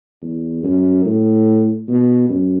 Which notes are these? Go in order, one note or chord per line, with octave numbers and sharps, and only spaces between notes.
E2
F#2
A2
B2
F#2